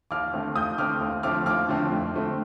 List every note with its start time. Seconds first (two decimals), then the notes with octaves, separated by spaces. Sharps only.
0.11 D#2 D6 F6
0.33 D3 A3 C4
0.56 D#2 D#6 G6
0.78 D3 A3 C4 D6 F6
1.01 D#2
1.23 D3 F3 A3 C4 D6 F6
1.46 D#2 D6 F6
1.68 D3 F3 A3 C4
1.92 F2
2.13 D3 A3 C4